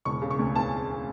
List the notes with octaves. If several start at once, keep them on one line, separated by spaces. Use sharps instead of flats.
E1 C#6
C#3
C#6
D2
E3 A5